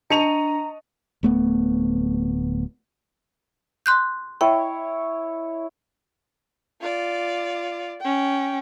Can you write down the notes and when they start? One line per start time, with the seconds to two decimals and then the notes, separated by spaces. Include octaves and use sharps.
0.10 D4 D#5 A5 A#5 C#6 C#7 D#7 F7
1.23 D1 A3 B3
3.86 C6 F#6 G6
4.41 E4 C#5 D#5 G5
6.81 F4 D5
8.01 C#4 G5